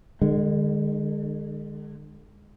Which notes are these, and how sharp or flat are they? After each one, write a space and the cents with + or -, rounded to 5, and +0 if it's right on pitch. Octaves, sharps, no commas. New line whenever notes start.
D3 +40 G#3 -15